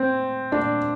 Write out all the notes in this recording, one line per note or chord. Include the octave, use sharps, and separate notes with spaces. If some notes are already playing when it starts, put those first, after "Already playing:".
Already playing: C4
D4